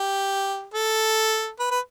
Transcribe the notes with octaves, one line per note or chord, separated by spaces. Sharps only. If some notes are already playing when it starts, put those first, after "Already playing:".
Already playing: G4
A4
B4
B4